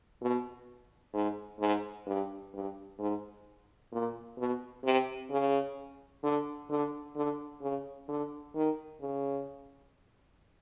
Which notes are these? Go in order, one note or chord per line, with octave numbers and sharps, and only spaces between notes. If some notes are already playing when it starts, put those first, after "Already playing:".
B2
G#2
G#2
G2
G2
G#2
A#2
B2
C3
C#3
D3
D3
D3
C#3
D3
D#3
C#3